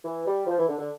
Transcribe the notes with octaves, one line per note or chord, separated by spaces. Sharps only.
E3
G3
F3
E3
D3
D3